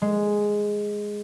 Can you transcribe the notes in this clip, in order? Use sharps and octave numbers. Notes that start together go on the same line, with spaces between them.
G#3